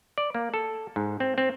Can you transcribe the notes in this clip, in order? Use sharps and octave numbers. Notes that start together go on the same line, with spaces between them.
D5
A#3
A4
G#2
C4
C4